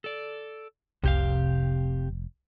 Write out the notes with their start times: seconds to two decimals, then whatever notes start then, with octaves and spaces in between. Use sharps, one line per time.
0.04 A4 D5
1.04 F1 C2 C3 G4 F5